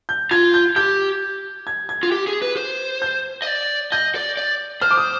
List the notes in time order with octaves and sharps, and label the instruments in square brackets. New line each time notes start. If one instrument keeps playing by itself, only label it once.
[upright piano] G6
[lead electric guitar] F4 [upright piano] G#6
[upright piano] G6
[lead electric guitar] G4 [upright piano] G6
[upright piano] G#6
G#6
[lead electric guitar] F4
G4
G#4
B4
C5
[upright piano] G6
[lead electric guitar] D#5
D5
[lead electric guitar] D#5 [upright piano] G6
[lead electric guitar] D5
D5
[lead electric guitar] C5 [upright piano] F6
[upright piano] D6
D#6